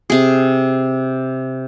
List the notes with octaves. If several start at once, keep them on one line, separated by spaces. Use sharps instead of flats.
C3 G#4